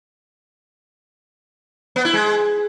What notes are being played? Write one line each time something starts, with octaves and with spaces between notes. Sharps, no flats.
B3
E4
G#3